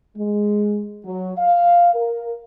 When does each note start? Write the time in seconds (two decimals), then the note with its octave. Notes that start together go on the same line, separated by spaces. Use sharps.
0.17 G#3
1.05 F#3
1.38 F5
1.94 A#4